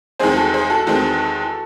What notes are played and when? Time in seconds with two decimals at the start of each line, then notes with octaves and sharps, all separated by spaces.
0.19 E2 D#3 G#3 C4 G#4 C5
0.36 F#4 A4
0.54 G#4 C5
0.70 F#4 A4
0.87 E2 D#3 G#3 C4 F#4 A4